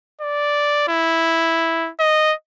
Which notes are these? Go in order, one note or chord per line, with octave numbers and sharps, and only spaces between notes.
D5
E4
D#5